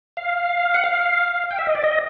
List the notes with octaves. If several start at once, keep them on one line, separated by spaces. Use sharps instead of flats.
F5
F#5
F5
G5
E5
D#5
D5
D#5